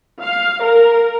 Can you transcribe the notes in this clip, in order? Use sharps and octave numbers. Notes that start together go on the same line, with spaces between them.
F5
A#4